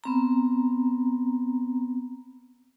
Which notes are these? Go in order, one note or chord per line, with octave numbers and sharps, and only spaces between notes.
B3 C4 A#5